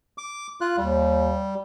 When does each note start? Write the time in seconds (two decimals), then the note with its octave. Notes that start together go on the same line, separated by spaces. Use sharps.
0.18 D6
0.61 F4 F#6
0.77 D#2 G3